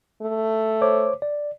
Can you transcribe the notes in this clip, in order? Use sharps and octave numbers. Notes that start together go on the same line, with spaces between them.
A3
C5 C#5 D6
D5